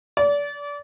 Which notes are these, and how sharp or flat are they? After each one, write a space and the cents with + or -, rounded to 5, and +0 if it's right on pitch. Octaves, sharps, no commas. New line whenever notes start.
D5 -30